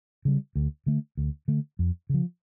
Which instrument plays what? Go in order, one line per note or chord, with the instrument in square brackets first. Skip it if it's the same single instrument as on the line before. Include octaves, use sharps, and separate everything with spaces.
[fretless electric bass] C#3 G3
D2
D3 A3
D2
D3 A3
F2
C#3 F3